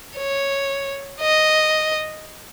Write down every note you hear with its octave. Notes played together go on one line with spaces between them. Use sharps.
C#5
D#5